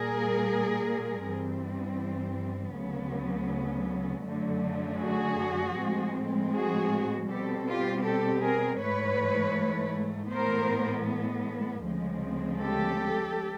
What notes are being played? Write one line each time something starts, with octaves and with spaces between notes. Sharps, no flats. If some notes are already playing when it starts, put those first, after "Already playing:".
Already playing: A#2 G3 A#3 G#4 A#4
G2 E3 G3 C4
D2 C#3 F#3 B3
F#2 D3 F#3 A3
F#4 G#4
A2 F3 G#3 C4
F#4 G#4
B2 G3 C4 G4 A4
F4 G4
G4 A4
G#4 A#4
G#2 E3 A3 B4 C#5
A2 E3 G#3 B3 A#4 C5
D2 C#3 F3 G#3 C4
G4 A4